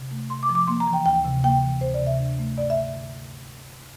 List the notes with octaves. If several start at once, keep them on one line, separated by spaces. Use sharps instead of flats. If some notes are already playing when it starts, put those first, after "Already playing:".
Already playing: C3
A3
C3 C6
D6
F3
D6
A#3 C6
A#5
E3
G5
D2 G5
C3
A#3 G5
E3
D2 C5
D5
C3
E5
D4
A3
G2 D5
E5
D3